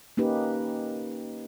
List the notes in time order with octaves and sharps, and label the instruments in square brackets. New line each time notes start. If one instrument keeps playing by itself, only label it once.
[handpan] A#3 C#4 D#4 G4 B4